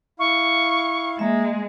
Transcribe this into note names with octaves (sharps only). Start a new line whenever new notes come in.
E4 F5 C#6
G#3 A#3 E5